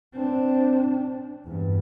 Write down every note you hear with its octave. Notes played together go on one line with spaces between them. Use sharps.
C4 D4
E2 G2